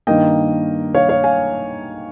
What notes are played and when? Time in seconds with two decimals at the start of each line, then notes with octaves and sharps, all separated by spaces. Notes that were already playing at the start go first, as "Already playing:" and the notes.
0.07 G2 D#3 A#3 D#5 G5
0.94 C#5 F5
1.09 C#5 F5
1.24 F5 G#5